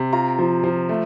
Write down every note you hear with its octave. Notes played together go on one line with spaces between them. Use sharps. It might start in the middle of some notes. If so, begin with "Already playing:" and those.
Already playing: C3
F4 A#5
F3
F3
A3